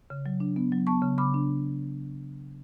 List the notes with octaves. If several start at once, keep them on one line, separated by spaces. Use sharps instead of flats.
C#3
F#3
D4
B3
F#3
B3 A5 C#6
C#3
C#3 B5 D6
D4